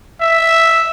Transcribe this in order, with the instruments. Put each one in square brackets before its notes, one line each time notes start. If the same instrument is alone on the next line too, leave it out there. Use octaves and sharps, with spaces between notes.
[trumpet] E5